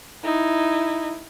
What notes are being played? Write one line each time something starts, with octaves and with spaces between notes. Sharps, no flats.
D#4 E4